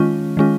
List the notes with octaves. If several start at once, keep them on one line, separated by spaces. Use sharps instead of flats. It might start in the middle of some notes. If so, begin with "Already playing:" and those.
Already playing: D#3 G#3 C#4 F4
D#3 G#3 C#4 F4